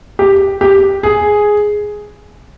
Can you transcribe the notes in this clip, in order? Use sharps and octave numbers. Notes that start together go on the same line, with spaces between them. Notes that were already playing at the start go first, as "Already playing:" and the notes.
G4
G4
G#4